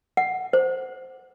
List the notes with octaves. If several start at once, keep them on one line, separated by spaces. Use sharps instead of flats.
F#5
C5